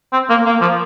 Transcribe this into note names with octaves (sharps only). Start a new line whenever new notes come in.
C4
A#3
A#3
F3